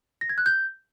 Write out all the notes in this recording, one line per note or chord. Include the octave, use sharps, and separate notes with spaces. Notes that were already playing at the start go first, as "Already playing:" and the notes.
A#6
G#6
F#6
G6